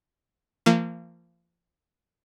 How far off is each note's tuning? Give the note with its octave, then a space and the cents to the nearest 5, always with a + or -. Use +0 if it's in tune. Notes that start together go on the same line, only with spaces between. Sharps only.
F3 -35 A#3 -30